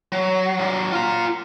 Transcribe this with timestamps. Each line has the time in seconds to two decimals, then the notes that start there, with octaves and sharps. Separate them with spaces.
0.12 F#3
0.60 F#3 D4
0.92 F4 A#5